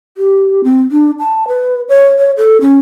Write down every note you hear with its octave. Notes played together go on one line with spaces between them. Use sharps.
G4
C4
D4
A5
B4
C#5
C#5
A4
C#4